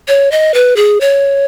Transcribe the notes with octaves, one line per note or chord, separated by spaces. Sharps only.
C#5
D#5
B4
G#4
C#5